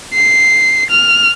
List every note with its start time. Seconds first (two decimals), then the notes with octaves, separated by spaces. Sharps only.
0.14 C7
0.90 F6